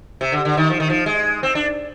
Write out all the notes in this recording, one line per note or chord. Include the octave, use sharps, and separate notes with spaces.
C3
D3
D3
D#3
F3
D#3
F3
G#3
C4
D4